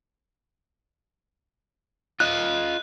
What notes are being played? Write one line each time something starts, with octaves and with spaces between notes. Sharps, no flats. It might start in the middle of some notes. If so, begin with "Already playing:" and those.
F4 D#5 F#6